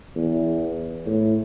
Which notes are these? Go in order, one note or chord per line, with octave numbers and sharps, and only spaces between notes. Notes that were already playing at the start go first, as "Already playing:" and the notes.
E2
A2